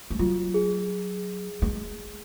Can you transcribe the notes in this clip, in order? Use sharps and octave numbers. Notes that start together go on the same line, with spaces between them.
G#3
F#3 F4
G#4
G#3